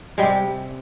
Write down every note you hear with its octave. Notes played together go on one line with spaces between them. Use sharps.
C3 G3 G#3